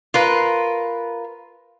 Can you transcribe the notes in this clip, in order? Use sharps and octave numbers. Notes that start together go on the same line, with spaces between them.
F4 A#4 B4